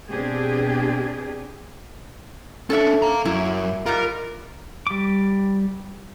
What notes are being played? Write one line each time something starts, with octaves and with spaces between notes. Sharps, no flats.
B2 C4 D4 G4 G#4
C#4 D4 A4 C#5 E5
F5 A#5
F#2 A#3 E4
G#2 G3 F4 A#4
G3 D6